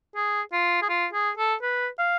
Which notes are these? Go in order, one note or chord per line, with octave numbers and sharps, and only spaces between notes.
G#4
F4
G#4
F4
G#4
A4
B4
F5